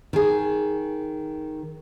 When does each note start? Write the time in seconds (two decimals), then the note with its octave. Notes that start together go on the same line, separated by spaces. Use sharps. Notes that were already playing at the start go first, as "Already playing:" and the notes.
0.13 D#3 G#4